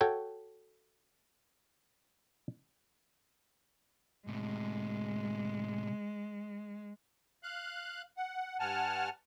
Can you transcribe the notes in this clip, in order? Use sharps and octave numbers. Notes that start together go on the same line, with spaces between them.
F#4 A4 C#5 G5
A2 C3 G#3
F5 F#6
F#5
G2 F#5 G#5 A5 F6